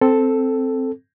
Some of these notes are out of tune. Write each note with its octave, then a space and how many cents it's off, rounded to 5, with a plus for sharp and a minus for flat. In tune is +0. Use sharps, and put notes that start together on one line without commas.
C4 +0 A4 +0